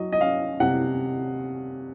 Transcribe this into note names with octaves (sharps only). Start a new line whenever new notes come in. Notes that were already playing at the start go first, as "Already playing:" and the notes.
Already playing: F#3 D#5
D#5
C#4 F5
C3 F#5